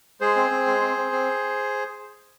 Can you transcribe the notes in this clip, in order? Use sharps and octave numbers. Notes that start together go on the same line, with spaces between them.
G#3 G#4 C5
C4
C4
G#3
C4
C4
C4